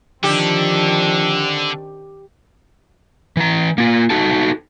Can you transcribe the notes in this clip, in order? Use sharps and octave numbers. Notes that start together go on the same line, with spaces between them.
D3 D#3 F3 C4 D4 G4 A4
E3 A#5
A#3 F4
D#4 F#4 A4 A5